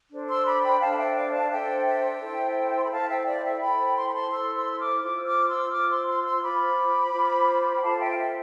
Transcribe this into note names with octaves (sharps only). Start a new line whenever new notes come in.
D4 A4 C5
C6 E6
B5 D6
G5 B5
D4 A4 C5 F5 A5
A5
E5 G5
D5 F5
F5 A5
D4 A4 C5 E5 G5
E5 G5
E4 A4 C5
C6
B5
E4 A4 C5 F5 A5
E5 G5
G5
D5 F5
E5 G5
E4 A4 C5 G5 B5
C6
B5
A5 C6
E4 A4 C5 C6 E6
C6 E6
E6
D6 F6
F4 C5 D6
E6
D6 F6
C6 E6
F4 C5 D6 F6
C6 E6
C6 E6
C6 E6
F4 C5 B5 D6
F4 C5
G5
F4 A4 C5 F5 A5
E5 G5
F5
E5